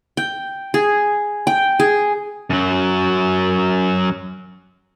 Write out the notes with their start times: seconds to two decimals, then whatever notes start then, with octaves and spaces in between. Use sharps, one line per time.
0.17 G5
0.74 G#4
1.47 G5
1.80 G#4
2.50 F#2 F#3